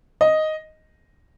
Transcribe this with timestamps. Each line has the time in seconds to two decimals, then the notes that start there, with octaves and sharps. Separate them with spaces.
0.21 D#5